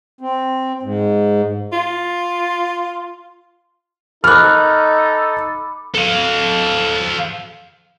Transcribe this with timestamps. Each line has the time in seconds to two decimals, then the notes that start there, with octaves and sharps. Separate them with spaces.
0.21 C4
0.83 G#2
1.72 F4
4.24 D#4 A4 B5 D6 F6 F#6
5.95 A4 F5